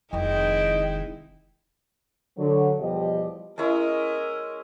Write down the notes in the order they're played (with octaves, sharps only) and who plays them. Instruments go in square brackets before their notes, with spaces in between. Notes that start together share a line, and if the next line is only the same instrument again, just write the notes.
[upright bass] F1 D#3 [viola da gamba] G#3 D#4 E4 [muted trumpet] D#5 [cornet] G5
[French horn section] D3 F#3
E2 B2 F3 G3 G4 D#5
[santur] G#3 C#4 E4 [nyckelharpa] A#4 D#5